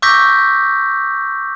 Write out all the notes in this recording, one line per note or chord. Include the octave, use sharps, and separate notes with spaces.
C#6 D6 E6 G6 A#6 B6